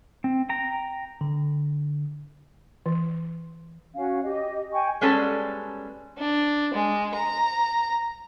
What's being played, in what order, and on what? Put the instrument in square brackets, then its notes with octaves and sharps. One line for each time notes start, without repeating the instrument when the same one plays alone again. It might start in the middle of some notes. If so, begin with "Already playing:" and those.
[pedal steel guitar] C4
G5 A#5
[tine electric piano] D3
[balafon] E3
[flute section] C#4 F#4 F5
G4 D#5
G5 G#5 C#6
[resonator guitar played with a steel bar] G3 G#3 B3 C#4 A4
[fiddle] D4
G#3
A#5